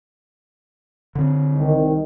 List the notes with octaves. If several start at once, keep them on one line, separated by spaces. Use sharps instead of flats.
D3 C4
C2 D#3